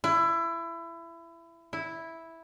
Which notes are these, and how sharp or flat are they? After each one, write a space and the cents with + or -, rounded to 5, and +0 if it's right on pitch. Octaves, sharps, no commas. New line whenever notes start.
E4 +25
E4 -5